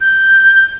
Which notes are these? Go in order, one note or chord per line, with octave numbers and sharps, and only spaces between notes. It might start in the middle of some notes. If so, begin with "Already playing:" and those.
G6